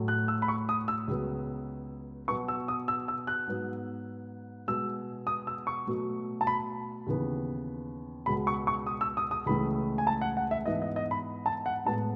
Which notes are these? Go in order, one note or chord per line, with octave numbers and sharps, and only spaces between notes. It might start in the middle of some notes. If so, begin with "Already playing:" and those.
Already playing: A2 F#3 A3
F#6
E6
B5
C#6
D#6
E6
C#2 C#3 F#3 B3
B2 F#3 B3 C#6
E6
D#6
E6
E6
F#6
G#2 F#3 B3
B2 G#3 B3 E6
D#6
E6
C#6
B2 F#3 A3
A5
B5
D#2 C#3 E3 B3
C#2 B2 G#3 B5
C#6
C#6
D#6
E6
D#6
D#6
C#2 C#3 E3 A3 B5
G#5
A5
F#5
F#5
E5
G#2 E3 B3 D#5
D#5
D#5
B5
A5
F#5
A2 G#3 B3 A5